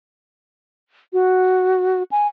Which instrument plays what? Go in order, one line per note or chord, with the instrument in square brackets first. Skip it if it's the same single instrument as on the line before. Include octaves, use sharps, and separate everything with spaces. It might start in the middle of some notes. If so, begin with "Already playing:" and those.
[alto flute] F#4
G#5